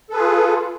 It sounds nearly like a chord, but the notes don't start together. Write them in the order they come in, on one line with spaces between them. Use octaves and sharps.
A4 B4 G#4 F4